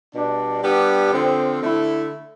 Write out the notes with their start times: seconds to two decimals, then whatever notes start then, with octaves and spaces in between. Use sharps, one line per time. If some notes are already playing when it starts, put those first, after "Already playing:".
0.14 B2 G3 D4
0.63 G3 B3 D4 G4
1.12 D3 F3 C4
1.61 D3 A3 E4 A4